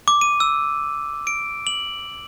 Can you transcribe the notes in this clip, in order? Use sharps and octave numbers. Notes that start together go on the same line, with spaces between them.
D6
D#7
E6
D7
F#7